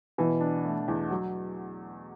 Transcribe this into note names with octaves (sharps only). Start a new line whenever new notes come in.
B2 E3
D4
A3
E2
F#3